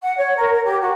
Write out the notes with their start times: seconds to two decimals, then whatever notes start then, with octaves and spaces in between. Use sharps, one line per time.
0.03 F#5
0.17 C#5
0.36 A#4
0.52 A#4
0.65 G4
0.81 F#4